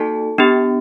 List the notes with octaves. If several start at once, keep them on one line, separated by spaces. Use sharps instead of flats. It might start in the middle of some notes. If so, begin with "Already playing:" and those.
Already playing: A#3 D#4 F#4 A4 A5
B3 D4 G4